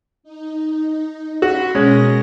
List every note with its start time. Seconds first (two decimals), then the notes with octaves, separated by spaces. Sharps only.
0.23 D#4
1.42 F#4 B5 C6
1.75 B2 G#3 C#4 A#4 A#6